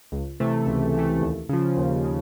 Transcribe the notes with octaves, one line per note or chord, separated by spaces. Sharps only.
C#2
C3 E3 A3
C#2
C3 E3 A3
D#2
C#3 F3
D#2
C#3